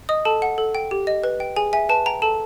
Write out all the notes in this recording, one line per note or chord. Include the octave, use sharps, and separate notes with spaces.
D#5 D#6
A4 A5
F#5
A4
G5
G4
D#5
B4
G5
G#4 G#5
E5 G#5
B4 A5
G5 A#5
A4 A5